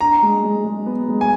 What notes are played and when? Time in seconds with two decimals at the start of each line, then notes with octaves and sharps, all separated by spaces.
0.01 D4 A#5
0.22 G#3
0.43 G#3
0.64 G#3
0.86 B3
1.08 G#3
1.21 G#5